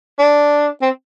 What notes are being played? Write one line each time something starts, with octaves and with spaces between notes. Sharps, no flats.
D4
C4